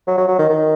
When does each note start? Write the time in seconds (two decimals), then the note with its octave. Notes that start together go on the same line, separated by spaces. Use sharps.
0.07 F#3
0.17 F#3
0.28 F#3
0.39 D#3
0.50 D#3